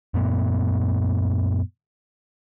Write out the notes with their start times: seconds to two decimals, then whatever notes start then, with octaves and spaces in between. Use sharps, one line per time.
0.14 F#2 A#2 B3